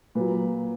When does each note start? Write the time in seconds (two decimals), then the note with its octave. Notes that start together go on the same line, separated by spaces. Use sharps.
0.15 A#2 F#3 B4